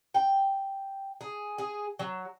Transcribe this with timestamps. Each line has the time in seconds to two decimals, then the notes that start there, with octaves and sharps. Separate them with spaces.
0.14 G5
1.21 G#4
1.58 G#4
1.99 F#3